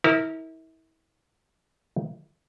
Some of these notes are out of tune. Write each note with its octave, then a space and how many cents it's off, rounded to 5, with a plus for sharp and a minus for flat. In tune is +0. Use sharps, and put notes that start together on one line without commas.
E4 -35 A#4 -10